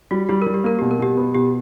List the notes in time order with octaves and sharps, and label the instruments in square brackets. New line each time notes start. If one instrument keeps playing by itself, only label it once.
[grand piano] G3 [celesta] F#4
[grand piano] G3 [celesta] G4
[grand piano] G3 [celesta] A#4
[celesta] G4
[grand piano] A#3 [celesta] A#4
[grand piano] B2 [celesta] G4
[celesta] A#4
[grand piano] B2 [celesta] G4
[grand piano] B3
[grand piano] B2 [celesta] G4